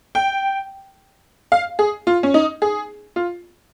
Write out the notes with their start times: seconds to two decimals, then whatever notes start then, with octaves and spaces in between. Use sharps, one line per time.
0.15 G5
1.52 F5
1.79 G#4
2.07 F4
2.23 C#4
2.34 D#4
2.62 G#4
3.16 F4